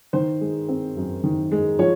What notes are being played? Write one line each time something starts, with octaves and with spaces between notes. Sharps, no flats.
D#3 C5
G#3
C4
F#2
D#3
G#3
F3 C#5